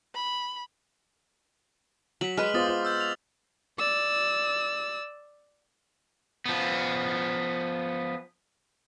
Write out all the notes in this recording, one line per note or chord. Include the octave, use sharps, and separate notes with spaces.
B5
F#3 B6 F#7
G#3 B4 F6
B3 F4 C5 D6 D#6 A6
F4 C5
D#6 E6 G6
F7
D5 E6
F3 B3